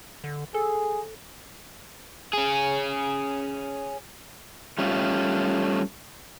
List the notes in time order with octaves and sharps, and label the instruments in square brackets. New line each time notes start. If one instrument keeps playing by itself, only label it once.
[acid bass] D3
[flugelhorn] G#4 [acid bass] A4
[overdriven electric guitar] C#4 G#4
[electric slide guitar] G3 A3 C#4 F4